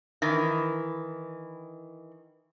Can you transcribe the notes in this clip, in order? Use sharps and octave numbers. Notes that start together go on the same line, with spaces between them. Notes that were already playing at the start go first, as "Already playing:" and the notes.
D#3 E3